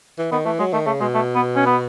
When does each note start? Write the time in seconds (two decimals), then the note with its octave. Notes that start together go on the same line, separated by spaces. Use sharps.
0.19 E3
0.32 D#3 B3
0.46 E3 A3
0.59 F#3 G#3
0.73 D#3 A3
0.87 C#3 A3
1.01 B2 G#3
1.15 A3
1.35 B3
1.56 C#4
1.66 B3